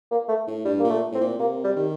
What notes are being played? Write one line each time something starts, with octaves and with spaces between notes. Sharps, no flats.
A#3
A3
A2
G2 G3
A#2 A#3
A3
A2 C4
A#2
C3 A#3
G3
D#3